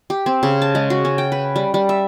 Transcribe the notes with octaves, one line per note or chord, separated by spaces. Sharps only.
G4
C4
C#3
A5
G#3
F#4
C#4
G5
B4
G3
G3
E5